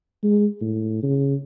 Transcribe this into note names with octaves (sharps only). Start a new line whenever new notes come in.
G#3
A2
C#3